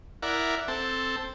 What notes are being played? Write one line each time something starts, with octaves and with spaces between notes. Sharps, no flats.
E4 A#4 D5 F#5
C4 A4